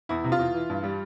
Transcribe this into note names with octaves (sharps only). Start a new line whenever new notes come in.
E2 E4
C3
F4
E2
E3
G2
G3